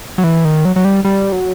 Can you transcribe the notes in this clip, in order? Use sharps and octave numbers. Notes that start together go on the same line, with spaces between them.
F#3
E3
D#3
F#3
F#3
G3
G3
F#3